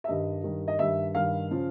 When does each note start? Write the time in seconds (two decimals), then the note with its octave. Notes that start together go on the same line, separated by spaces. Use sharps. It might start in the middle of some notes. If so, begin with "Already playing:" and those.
0.04 E5
0.08 G2 D#3 G3 D#5
0.43 G2 D#3 G3
0.68 D#5
0.79 G2 D#3 G3 E5
1.15 G2 D#3 G3 F5
1.51 C#3 F3